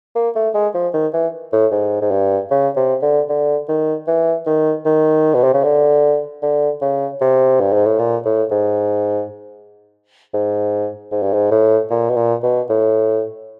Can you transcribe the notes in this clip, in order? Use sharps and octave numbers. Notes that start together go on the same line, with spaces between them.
A#3
A3
G#3
F3
D#3
E3
A2
G#2
G#2
G2
C#3
C3
D3
D3
D#3
E3
D#3
D#3
B2
C3
C#3
D3
D3
C#3
C3
G2
G#2
A2
A#2
A2
G#2
G#2
G#2
G2
G#2
A2
A#2
B2
A#2
B2
A2